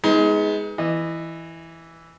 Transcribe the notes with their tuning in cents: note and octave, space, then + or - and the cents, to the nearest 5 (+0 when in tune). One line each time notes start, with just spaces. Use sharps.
G#3 +0 B3 +0 D#4 +30
E3 +0 D#5 -20